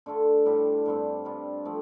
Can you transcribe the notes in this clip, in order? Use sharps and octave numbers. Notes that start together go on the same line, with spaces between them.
D3 A3 F4 A4
A2 G3 D4 G4
G2 G3 C4
G2 G3 F4
F3 A3 C4